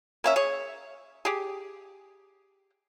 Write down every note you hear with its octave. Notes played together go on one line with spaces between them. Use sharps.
A#3 C#4 E5
G#4 C#5
G4 G#4